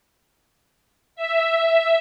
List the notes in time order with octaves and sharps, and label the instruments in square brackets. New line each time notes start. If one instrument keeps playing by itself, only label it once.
[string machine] E5